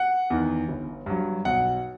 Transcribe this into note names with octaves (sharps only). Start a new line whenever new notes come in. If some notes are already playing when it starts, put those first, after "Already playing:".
Already playing: F#5
E2 D#3
G1
G2 F#3
B1 F#5